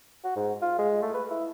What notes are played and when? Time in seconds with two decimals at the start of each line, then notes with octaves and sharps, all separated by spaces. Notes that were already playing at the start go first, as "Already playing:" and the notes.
0.24 F#4
0.36 G#2
0.62 F4
0.79 G#3
1.02 A3
1.14 B4
1.30 E4